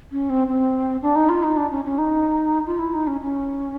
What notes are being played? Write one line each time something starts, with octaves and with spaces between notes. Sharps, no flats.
C#4
C4
C4
D4
D#4
F4
D#4
D4
C#4
C#4
D#4
F4
E4
D#4
C#4
C#4